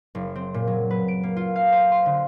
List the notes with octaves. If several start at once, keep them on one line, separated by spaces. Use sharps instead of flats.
F#1
C4
A#2
F#3
B4
D7
A#3
F4
F5
C5
C6
D3